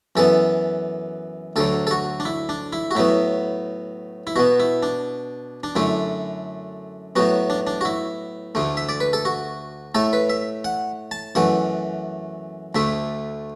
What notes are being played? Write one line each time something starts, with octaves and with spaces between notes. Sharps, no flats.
F#2 E3 B3 A4
D2 D3 F#3 A4
A4
F#4
D4
E4
D4
E4
F#4
A2 F#3 B3 E4
E4
B2 B3 F#4
E4
D4
D4
F#2 D3 A3 E4
A2 F#3 B3 F#4
D4
D4
F#4
E4
D2 D3 A3
E5
D5
B4
A4
F#4
A2 A3 A4
B4
E5
F#5
A5
F#2 E3 A3 F#5
D2 D3 A3 E5